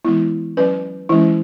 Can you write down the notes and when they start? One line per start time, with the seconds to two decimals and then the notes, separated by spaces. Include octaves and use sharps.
0.05 E3 G#3 B3 E4
0.57 F#3 C#4 B4
1.09 E3 G#3 C#4 E4